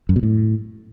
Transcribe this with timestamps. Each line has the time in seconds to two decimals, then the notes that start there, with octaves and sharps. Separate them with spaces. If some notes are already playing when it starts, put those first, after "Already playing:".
0.09 F#2
0.16 B2
0.23 A2